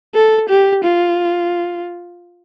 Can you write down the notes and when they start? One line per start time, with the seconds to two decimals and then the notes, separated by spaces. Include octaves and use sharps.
0.15 A4
0.49 G4
0.84 F4